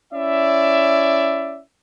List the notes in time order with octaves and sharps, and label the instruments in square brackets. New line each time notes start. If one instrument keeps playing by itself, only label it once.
[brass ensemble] C#4 E4 D5 E5